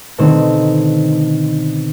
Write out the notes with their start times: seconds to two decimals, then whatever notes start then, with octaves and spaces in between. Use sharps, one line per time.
0.18 B2 D3 D#3 A3 C4 D#4